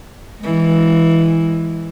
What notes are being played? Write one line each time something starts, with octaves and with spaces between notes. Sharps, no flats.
E3 G#3